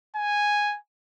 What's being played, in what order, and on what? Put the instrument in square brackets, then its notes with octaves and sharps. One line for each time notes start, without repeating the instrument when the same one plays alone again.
[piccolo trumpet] G#5